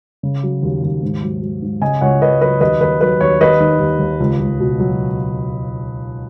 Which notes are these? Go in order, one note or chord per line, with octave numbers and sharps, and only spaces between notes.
C#3
F#3
D#2
D#2
G#2
F#3
F#3
G#2
C#3 D#5 G#5
C#2 C#5 F#5
C#2 B4 D#5
F#3 B4 D#5
D#2 B4 D#5
D#2 B4
F#3 B4
D#2 C#5
D#2 B4 D#5
D#3
D#2
D#2
C#2
C#2
B2
F#3